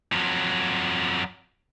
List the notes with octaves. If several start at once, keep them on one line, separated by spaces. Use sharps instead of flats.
F2 F#3